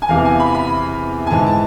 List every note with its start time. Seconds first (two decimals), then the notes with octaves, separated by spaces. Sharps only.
0.02 G#5
0.09 E2 C3 E3 F5
0.25 G#5
0.40 B5
0.54 B5
1.27 G#5
1.30 G#2 E3 A5
1.46 A5